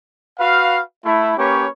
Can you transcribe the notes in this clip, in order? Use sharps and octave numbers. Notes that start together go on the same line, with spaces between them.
F#4 B4 F5
A3 E4
A#3 C#4 G4 B4 C#5